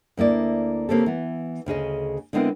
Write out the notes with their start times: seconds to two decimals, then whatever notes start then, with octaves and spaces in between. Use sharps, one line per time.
0.17 D2 A#3 E4 D5
0.89 C#3 A#3 C4 G4 A4
1.06 E3 B3
1.66 D2 C#3 G#4 D#5
2.33 D3 G#3 B3 C4 E4 A#4